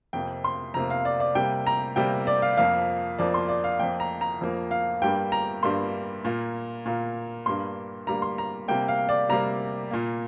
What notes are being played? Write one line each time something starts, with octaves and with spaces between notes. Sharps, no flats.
F2 C3 A#3 G5
C6
F2 C3 A#3 A#5
F5
D5
D5
C3 G3 A#3 G5
A#5
C3 G3 A#3 G5
D5
F5
F2 F3 A#3 F5
F2 F3 A#3 D5
C6
D5
F5
F2 F3 A#3 G5
A#5
A#5
F2 F3 A#3
F5
G2 G3 A#3 G5
A#5
G2 G3 A#3 C6
A#2 A#3
A#2 A#3
G2 G3 A#3 C6
G2 G3 A#3 A#5
C6
A#5
C3 G3 A#3 G5
F5
D5
C3 G3 A#3 A#5
A#2 A#3